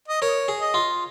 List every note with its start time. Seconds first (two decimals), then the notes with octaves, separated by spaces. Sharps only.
0.08 D#5
0.22 A#4 C#5
0.48 G#4
0.61 D#5
0.74 F4